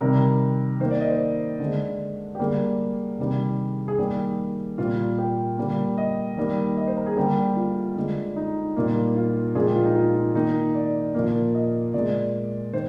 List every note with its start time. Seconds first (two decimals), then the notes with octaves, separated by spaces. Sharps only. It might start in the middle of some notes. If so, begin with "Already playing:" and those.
0.01 C3 D#3 G3 A#4
0.80 D#3 C5
0.85 A#3
0.91 D5
1.01 D#5
1.10 C5
1.59 D3 G#3
2.35 G4
2.39 D3 G3 A#3 G#4
3.18 C3 D#3 G3
3.88 G#4
3.99 D#3 G3 A#3 G4
4.78 A#2 G3 A#3 F4
5.18 G4
5.58 D3 G3 A#3
5.98 D#5
6.37 D#3 G3 A#3
6.77 D#5
6.87 C5
6.97 A#4
7.06 G#4
7.16 D3 G3 A#3 G4
7.56 F4
7.96 D3 G#3
8.36 D#4
8.76 A#2 G3 A#3
9.16 F4
9.55 A#2 F3 G#3 G#4
9.65 G4
9.75 F4
9.85 D#4
9.95 F4
10.15 F4
10.35 D#3 A#3 D#4
10.75 D5
11.14 A#2 F3 A#3
11.55 D#5
11.94 A#2 G#3 D5
12.73 D#3 C5